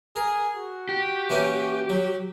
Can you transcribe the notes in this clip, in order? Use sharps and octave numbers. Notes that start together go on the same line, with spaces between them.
G#4 A#4
F#4
G4
E3 A#3 C#4
F#3